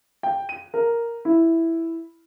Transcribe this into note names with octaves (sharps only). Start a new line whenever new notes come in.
G5
D#7
A#4
E4